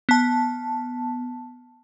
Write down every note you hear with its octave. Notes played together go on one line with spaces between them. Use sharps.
B3 A5